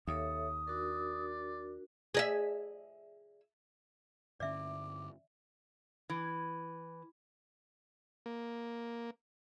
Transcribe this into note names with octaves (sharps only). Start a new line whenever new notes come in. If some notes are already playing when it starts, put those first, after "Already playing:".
D#2 A4 C#5 E5 D#6
D4 F#4 A#4 D5
G#4 D#5 E5
G2 D3 C#4 D5 E5 D6
E3
A#3